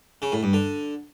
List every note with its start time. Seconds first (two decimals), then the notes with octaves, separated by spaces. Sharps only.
0.22 C#3
0.32 A2
0.43 G2
0.53 D3